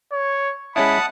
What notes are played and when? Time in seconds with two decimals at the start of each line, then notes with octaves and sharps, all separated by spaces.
0.12 C#5
0.76 G#3 C#4 E4 F#5 A5 B5 D#6